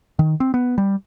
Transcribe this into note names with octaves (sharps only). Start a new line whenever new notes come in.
D#3
C4
B3
G3